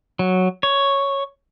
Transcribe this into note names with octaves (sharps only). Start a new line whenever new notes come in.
F#3
C#5